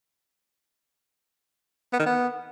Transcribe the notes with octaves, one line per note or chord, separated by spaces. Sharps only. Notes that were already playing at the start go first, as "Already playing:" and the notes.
B3
D#3
B3